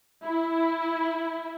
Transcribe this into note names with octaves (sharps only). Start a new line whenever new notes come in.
E4